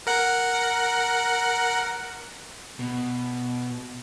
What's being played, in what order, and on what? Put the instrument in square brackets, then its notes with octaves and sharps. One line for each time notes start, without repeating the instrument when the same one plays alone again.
[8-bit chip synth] A#4 F#5
[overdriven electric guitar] B2